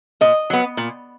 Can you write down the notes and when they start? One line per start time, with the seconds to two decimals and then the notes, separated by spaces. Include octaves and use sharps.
0.21 A#2 D#5
0.50 F#3 B3
0.77 A#2